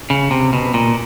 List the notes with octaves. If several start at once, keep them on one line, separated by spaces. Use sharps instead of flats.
C#3
C3
B2
A#2